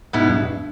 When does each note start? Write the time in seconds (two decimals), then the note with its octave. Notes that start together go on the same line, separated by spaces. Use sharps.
0.13 G#2 B2 G#3 B3 E4
0.29 G2